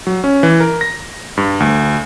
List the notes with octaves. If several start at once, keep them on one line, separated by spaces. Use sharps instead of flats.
F#3
C#4
E3
A#4
A#6
G2
D2